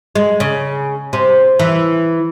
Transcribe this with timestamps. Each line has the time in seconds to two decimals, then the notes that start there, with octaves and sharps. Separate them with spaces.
0.15 G#3
0.40 C#3
1.13 C3
1.59 E3